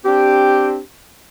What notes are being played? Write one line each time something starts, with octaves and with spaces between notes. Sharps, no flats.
C4 D4 G4